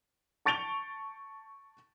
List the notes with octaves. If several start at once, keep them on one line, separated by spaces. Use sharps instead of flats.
A5 C#6 A6 D7 F7 G7